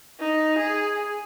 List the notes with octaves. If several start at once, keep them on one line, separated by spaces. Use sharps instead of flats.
D#4
G#4